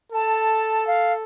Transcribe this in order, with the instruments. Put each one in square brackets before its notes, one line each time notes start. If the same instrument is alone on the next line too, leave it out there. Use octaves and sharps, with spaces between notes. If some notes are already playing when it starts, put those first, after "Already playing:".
[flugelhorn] A4 [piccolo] A5
[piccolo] F5